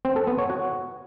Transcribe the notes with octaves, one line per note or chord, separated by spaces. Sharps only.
C4
A4
B3
C#5
F#4